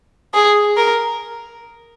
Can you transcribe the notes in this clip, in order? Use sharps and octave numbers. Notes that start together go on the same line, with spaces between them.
G#4
A#4